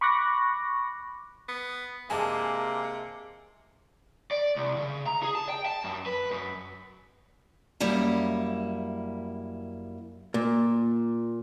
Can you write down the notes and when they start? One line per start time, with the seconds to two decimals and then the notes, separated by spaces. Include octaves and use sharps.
0.01 B5 C#6 D6 F#6 A#6
1.49 B3
2.10 C3 G#3 A#3 D4 G#5 A5 D6
4.31 D5
4.56 C2
4.77 C#3
5.06 A#5
5.23 G#4
5.35 A5
5.49 G5
5.65 A5
5.84 F#2
6.06 B4
6.31 F#2
7.80 F#2 G3 A#3 E4
10.34 A#2